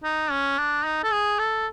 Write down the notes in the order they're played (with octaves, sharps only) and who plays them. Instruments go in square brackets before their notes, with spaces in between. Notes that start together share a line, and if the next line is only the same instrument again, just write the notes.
[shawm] D#4
C#4
D4
D#4
A4
G#4
A4